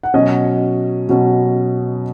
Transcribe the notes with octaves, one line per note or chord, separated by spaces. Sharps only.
F#5
B2 F#3 C#4 D#5
B2 F#3 C#4